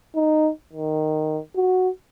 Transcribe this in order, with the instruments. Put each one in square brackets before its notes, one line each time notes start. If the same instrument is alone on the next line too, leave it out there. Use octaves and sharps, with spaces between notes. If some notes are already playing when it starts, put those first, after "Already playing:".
[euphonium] D#4
D#3
F#4